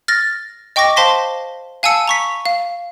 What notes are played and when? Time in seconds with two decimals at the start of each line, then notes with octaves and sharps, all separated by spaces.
0.08 F6 A6 A#6
0.76 D#5 G5 C#6 D6 A#6
0.96 C5 F5 A5 C6 A#6 B6
1.83 F5 G#5 A5 E6 C#7
2.08 A#5 C#6 B6
2.45 F5